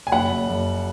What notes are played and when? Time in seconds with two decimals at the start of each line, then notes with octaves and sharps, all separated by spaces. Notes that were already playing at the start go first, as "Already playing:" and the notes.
0.07 G#5
0.12 F#1 F#5 B5
0.30 F#1
0.48 F#1